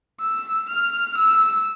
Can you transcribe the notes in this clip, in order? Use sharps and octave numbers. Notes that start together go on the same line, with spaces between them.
E6
F6
E6